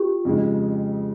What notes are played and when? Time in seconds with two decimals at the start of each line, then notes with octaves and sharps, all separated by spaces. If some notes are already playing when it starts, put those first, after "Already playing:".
Already playing: F4 G4
0.25 F2 C#3 G#3